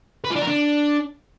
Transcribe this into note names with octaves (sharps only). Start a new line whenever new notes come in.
B4
F4
D4
A#4
D4